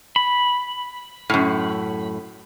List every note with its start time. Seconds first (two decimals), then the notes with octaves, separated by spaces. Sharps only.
0.16 B5
1.30 F#2 A2